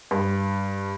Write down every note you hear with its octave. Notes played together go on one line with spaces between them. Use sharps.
G2